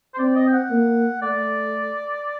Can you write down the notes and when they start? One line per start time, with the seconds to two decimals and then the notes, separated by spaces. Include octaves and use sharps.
0.14 C5
0.18 C4 D5
0.36 D#5
0.48 G5
0.53 F#5
0.70 A#3
1.21 A3 D5